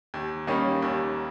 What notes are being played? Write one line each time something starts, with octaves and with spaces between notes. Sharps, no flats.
D#2
D#3 G3 A#3 C#4
D#2